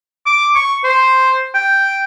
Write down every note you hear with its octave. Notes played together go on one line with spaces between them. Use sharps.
D6
C#6
C5
G5